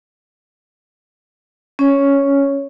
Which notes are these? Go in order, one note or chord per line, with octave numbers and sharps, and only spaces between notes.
C#4 C#5